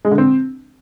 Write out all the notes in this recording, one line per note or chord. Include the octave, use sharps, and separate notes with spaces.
G#3
D3
C4